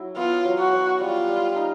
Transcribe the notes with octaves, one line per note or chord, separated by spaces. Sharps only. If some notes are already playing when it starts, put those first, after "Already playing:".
Already playing: F#3 E4
B3 F4
F#3
F#4
F#3
G3 F4
G3
D#4